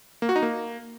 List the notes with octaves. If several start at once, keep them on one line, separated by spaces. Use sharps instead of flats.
A#3
F#4
D#4
A#3